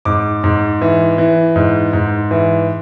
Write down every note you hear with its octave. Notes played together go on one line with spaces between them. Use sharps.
G#2 D6
G#2
E3
E3
G#2
G#2
E3